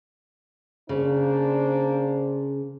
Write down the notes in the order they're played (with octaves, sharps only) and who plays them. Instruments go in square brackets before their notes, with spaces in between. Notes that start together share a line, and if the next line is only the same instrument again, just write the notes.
[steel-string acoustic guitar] C#3 [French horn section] A#3 D4 C5